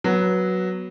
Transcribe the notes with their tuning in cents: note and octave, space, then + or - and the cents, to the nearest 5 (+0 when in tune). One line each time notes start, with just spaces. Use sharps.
F#3 +0 B3 -15